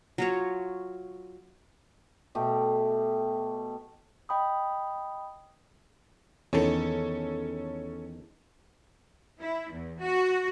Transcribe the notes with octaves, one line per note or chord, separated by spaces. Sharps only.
F#3 F4 C#5
B2 A3 G4
D#5 G5 B5 D#6
E2 D#3 C#4 A4
E4
E2
F#4